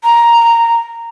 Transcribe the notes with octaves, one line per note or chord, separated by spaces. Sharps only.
A#5